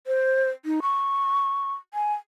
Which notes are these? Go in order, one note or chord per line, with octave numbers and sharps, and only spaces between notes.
C5
D#4
C#6
G#5